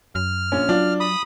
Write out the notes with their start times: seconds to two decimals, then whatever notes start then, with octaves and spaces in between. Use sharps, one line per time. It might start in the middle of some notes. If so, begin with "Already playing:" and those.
0.15 F#2 F6
0.52 A#1 C#4
0.69 F#3 D4 F4
1.00 B5 D#6